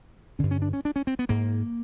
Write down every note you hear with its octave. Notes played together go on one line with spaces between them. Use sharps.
G2 D3 C#4
C#4
D4
C#4
D4
C#4
C4
B3
G#2 A#3